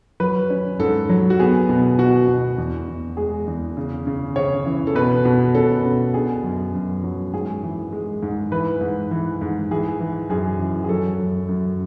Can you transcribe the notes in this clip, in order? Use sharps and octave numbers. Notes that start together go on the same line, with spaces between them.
F#3 B4
C#4
G#2 A4
F#3
F#4
B3 G#4
B2
B2 F#4
B2
E2
E2
G#3 G#4
E2
C#3
C#3
C#3 C#5
E3
A4
B2 B4
B2
C#4 A4
B2
D3 G#4
F#2
F#2
F#3
G#2 G#4
E3
G#3
G#2
E3 B4
G#2
E3
G#2
E3 G#4
E3
F#2 G#4
E3
G#4
F#3 A4
F#2
F#2